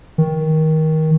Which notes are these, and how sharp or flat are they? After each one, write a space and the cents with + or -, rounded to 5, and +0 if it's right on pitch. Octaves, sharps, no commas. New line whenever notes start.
D#3 +20